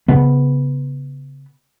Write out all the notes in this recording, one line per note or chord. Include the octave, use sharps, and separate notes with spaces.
C#3 B3